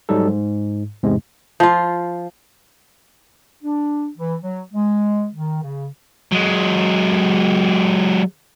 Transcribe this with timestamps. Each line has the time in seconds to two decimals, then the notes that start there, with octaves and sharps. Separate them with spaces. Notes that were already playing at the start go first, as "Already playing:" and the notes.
0.09 G#2 F#3 G3 D#4 A4
0.27 G#2
1.03 E2 G#2 C3 G#3
1.60 F3 F4
3.63 D4
4.18 E3
4.43 F#3
4.73 G#3
5.34 D#3
5.63 C#3
6.32 F#3 G#3